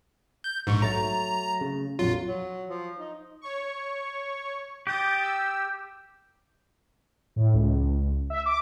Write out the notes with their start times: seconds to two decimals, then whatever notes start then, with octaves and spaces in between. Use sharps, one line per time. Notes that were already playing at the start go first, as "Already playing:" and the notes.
0.44 G6
0.67 A#1 G#2 C#6
0.82 F#3 A3 A#5 A6
1.61 C#3
1.99 A#1 F2 F#3 F4
2.28 F#3
2.69 F3
2.99 D#4
3.41 C#5 C#6
4.87 G4 D#6 G6 A6
5.22 E6
7.36 A2
7.54 C#2
8.30 E5
8.46 D6